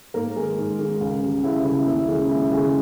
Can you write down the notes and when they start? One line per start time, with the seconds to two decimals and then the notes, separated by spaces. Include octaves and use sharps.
0.14 G#2 A#3 A#4
0.36 D#3 G#3
0.58 G#2
0.79 D#3 G#3
1.01 C#2
1.22 C#3 G3
1.43 C#2 E4
1.65 C#3 G3 E4
1.86 D#2 E4
2.08 C#3 G#3
2.30 D#2 E4
2.51 C#3 G#3